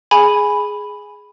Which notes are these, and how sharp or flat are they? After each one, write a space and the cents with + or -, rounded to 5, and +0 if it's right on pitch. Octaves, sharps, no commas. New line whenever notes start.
G#4 +0 G#5 +0 B5 +0